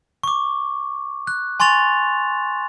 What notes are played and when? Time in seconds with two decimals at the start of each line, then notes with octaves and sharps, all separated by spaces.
0.23 C#6 D6
1.27 F#6
1.60 G#5 C6 C#6 A6 F7